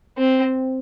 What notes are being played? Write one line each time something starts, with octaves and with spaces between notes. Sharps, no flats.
C4